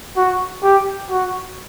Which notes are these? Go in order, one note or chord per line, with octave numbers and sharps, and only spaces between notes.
F#4
G4
F#4